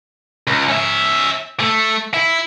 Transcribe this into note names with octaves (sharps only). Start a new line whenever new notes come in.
C#2
C#4 E5
A3
E4